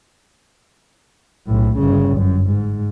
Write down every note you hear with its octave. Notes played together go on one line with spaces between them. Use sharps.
B1 A2
G1 C#3
F#2
G#2